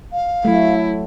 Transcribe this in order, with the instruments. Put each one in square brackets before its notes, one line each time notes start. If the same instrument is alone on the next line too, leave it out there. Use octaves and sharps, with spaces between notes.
[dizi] F5
[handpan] F#3 A3 [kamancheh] E4